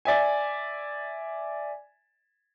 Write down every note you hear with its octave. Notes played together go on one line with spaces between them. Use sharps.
D5 E5 G#5